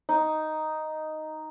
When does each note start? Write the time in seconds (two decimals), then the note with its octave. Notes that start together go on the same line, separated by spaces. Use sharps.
0.09 D#4